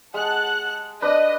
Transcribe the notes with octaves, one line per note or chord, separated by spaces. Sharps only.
G#3 F#5 A5 F#6
D4 B4 D#5